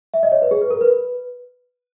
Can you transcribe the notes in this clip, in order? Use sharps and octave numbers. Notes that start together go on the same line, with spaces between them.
E5
D#5
C#5
B4
G#4
B4
A#4
B4